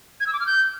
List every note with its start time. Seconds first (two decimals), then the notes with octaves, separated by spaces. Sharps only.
0.20 G#6
0.27 E6
0.33 D6
0.40 F6
0.46 G6